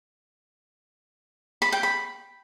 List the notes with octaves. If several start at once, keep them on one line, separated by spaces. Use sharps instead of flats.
B5
G5
B5